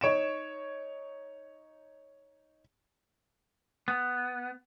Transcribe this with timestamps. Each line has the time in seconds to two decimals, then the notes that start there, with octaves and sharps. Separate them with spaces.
0.01 D#4 C#5 D7 E7
3.88 B3